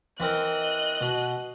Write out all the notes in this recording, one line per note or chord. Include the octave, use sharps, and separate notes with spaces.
E3 C4 A#4 D#5 F#6
B2